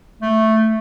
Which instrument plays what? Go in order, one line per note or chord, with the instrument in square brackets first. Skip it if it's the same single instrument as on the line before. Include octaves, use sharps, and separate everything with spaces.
[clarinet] A3